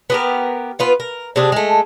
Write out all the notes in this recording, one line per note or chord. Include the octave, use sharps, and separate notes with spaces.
B3 G4 A#4
B3 F4 B4
A#4
C3 C4 D4 G#4
G#3 A3